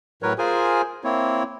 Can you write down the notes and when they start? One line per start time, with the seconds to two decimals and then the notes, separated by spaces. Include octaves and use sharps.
0.23 A2 F#3 A#4 B4 C#5
0.38 F4 G#4 A#4 C5 G#5
1.04 A#3 C4 E4 C#5